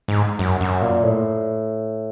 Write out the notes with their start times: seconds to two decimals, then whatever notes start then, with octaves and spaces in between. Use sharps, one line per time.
0.08 G#2
0.39 F#2
0.61 F#2
0.82 A#2
1.03 A2